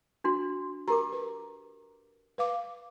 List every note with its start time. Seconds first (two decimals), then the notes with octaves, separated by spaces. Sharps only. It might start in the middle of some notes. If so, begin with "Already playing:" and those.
0.24 D4 F#4 C6
0.88 G4 A#4 A#5 D6
1.12 B4
2.38 B4 F5 D6